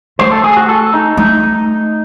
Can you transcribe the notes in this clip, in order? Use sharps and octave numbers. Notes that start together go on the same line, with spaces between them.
A3 C5
A4
G#4
F#4
A4
D#4
A3 D#4